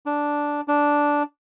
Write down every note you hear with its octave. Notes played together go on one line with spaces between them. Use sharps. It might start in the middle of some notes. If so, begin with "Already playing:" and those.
D4
D4